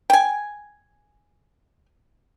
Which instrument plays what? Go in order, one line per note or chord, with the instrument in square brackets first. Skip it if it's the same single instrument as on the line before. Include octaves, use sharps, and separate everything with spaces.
[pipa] G5 G#5